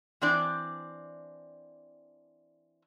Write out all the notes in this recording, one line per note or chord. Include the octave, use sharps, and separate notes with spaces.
E3 C4 D4 D5